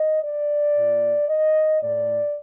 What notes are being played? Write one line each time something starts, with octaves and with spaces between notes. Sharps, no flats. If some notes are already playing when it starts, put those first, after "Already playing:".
Already playing: D#5
D5
A#2
D#5
A2 D5